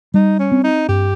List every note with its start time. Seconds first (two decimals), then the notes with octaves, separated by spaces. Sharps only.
0.14 G3 D#4
0.39 C#4
0.52 C4
0.64 D#4
0.89 G2 G4